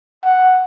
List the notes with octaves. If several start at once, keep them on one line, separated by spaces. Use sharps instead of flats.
F#5